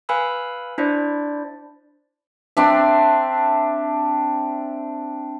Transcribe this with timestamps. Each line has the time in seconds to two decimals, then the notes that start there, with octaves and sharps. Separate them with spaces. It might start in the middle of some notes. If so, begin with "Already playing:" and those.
0.09 B4 F5 G#5 B5 E6
0.78 D4 E4 C5 D5
2.57 C4 D4 E5